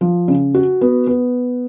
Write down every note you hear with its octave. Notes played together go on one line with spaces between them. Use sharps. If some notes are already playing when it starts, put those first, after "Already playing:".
F3
C#3
F#4
B3
B3